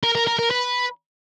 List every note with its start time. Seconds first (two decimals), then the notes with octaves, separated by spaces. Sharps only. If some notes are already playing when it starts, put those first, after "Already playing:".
0.03 A#4
0.15 A#4
0.27 A#4
0.39 A#4
0.51 B4